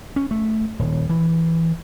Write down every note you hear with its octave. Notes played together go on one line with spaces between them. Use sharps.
C#4
A3
D#1
E3